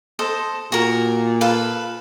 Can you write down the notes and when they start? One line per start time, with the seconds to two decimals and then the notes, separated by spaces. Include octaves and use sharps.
0.19 A4 C5 D#5
0.72 A#2 F#4 A#4
1.41 A4 B4 F5